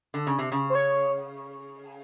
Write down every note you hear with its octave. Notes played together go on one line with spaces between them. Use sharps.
D3
C#3
C3
C#3
C5
C#5